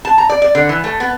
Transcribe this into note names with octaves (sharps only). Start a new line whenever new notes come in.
A5
A#5
D5
D5
D3
E3
A3
B3